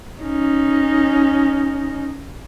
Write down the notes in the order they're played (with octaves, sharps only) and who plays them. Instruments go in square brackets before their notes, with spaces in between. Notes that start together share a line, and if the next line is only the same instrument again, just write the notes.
[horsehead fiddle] C#4 D#4